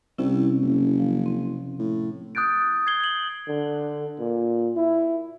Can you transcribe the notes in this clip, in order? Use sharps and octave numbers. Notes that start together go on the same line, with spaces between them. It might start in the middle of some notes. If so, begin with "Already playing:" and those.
C2 C3 C#4 E4
F#1
F3
C4
A2
D#6 F#6 G6 A6 D7
G#6 C7 G7
G#6 F#7
D3
A#2
E4